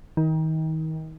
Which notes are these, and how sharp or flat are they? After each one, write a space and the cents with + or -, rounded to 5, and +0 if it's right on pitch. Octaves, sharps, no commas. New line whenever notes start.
D#3 +30